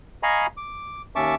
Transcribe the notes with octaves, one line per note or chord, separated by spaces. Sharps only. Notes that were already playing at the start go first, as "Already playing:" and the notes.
D#5 F5 G#5 A#5 B5 C#6
D6
D#2 C#4 E5 A5 C#6 D6